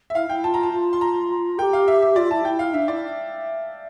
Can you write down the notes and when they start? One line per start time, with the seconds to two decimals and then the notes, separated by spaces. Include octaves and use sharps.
0.10 E5
0.15 E4 F5
0.29 E4 G5
0.44 F4 A5
0.54 A#5
0.63 A5
0.73 F4
0.93 C6
1.01 A#5
1.58 G4 A#4 G5
1.73 F5
1.88 E5
2.02 E5
2.16 F4 D5
2.31 E4 A5
2.45 E4 G5
2.59 F5
2.74 D4 E5
2.88 E4 D5